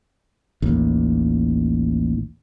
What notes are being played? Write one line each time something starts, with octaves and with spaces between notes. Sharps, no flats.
A1 D#2